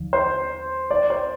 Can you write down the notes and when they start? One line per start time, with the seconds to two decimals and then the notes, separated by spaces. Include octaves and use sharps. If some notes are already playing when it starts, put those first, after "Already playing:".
Already playing: D#2 D3 F3
0.13 C5
0.91 D5
1.10 C5